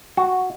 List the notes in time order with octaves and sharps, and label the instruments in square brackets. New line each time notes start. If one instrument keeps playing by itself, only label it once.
[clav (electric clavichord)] F#4